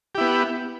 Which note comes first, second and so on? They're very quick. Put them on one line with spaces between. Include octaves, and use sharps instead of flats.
G4 E4 B3